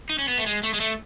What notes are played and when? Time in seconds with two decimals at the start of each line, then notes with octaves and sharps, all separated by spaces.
0.09 D#4
0.19 C#4
0.28 B3
0.38 A3
0.46 G#3
0.63 A3
0.74 G#3
0.80 A3